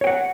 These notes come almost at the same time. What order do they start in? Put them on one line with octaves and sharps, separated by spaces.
C#5 G5 F#5